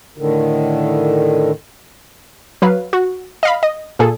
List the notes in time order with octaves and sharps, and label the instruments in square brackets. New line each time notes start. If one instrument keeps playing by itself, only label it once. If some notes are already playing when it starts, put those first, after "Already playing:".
[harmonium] A2 D3 D#3
[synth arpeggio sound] F#3 B4 F5
F#4
D#5 F5 B5
D#5
A#2 G#4 A4